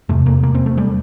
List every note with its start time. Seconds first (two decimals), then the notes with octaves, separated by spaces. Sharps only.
0.09 F1 E2 C3 A3
0.26 A#3
0.43 A#3
0.55 C4
0.66 A3
0.77 G3